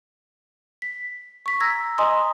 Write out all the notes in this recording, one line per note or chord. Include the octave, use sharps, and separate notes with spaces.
B6
C#6 B6
A#5 E6 G#6 A#6
D#5 G#5 A#5 C6 D#6